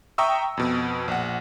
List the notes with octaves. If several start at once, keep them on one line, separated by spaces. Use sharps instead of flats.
E5 G5 A#5 C#6 D#6 E6
F2 B2
A#1 F#5